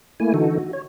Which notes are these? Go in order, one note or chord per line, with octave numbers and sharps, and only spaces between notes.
A3 A#3 E4 G#5
D3 E3 D#4 F#4 A4
F#4
C#5